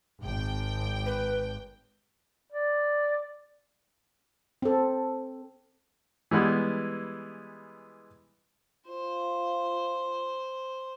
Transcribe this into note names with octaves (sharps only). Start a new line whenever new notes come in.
G#1 G5
B4
D5
C4 A4
E3 G3 G#3 B3
F4 C5